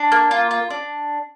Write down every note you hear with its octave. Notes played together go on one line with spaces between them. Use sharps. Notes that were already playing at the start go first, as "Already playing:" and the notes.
Already playing: D4
A#3
F4
F4
D4